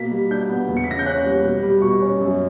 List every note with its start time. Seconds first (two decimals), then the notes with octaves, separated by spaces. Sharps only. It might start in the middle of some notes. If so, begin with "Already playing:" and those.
Already playing: B2 A#3 B6
0.11 G3
0.31 D4 G6
0.49 B3
0.69 E2
0.77 C#7
0.84 B6
0.88 C#3 A#6
0.99 G6
1.06 C#4 F#6
1.25 G3
1.44 B2
1.63 G3
1.82 B2 C#6
2.02 C#4
2.21 F#2